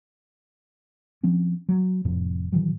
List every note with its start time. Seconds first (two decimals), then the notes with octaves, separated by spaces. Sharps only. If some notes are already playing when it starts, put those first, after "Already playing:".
1.23 F3 C4 C#4
1.69 F#3
2.05 F1 F2 A2 C3
2.52 A2 D#3 E3 F#3